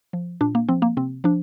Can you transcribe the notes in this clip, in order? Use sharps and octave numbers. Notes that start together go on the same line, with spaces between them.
F3
A#2 D4
A#3
F3 C4
A#3
C3 C4
F3 D4